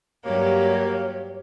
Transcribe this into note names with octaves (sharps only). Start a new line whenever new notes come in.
G2 F#3 A#3 G4 C#5